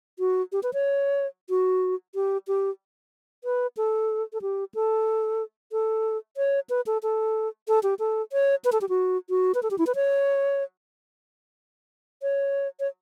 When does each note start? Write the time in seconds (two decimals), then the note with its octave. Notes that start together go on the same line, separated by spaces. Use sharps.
0.19 F#4
0.52 G4
0.63 B4
0.74 C#5
1.49 F#4
2.15 G4
2.47 G4
3.44 B4
3.77 A4
4.33 A4
4.42 G4
4.75 A4
5.72 A4
6.37 C#5
6.70 B4
6.87 A4
7.03 A4
7.68 A4
7.83 G4
7.99 A4
8.33 C#5
8.65 B4
8.72 A4
8.81 G4
8.89 F#4
9.30 F#4
9.55 B4
9.63 A4
9.71 G4
9.78 E4
9.87 B4
9.95 C#5
12.22 C#5
12.80 C#5